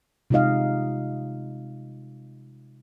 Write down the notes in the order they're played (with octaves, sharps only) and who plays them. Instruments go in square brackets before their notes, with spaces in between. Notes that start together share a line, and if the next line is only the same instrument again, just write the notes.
[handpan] C3 G#3 D#4 F4 D#5 F5